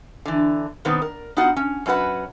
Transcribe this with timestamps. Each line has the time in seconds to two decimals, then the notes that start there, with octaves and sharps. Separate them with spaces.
0.26 D3 E3
0.85 B2 D#3 G3 B3 C4
1.02 A#4
1.37 B3 D#4 F4 F#4 F#5
1.56 C#4
1.86 F#2 C#4 F#4 B4 F#5